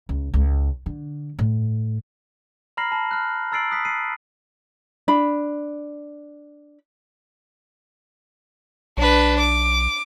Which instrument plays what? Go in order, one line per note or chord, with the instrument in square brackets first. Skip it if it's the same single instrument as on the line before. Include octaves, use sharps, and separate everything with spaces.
[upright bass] C#2
C#2
D3
A2
[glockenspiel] A#5 B5 F6 A#6 C7 F#7
A5 B5
F6 F#6
A#5 E6 A6 C7 D7 F#7
D#6 F#6 B6
C7 D#7
[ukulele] D4 B5
[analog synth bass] B1 [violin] D4 B4
[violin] D6